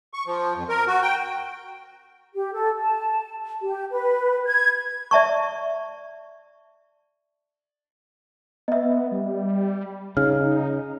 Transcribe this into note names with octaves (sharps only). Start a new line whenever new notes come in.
C#6
F3
F2
A#4
F#4
G5
G4
A4
A5
G4
B4
G#6
D5 E5 A5 C#6
B3 D#5 E5
G3
C#3 D#4 F6